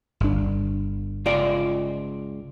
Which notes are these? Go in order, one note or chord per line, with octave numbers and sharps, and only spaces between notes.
G1 D4
C#2 F4 D5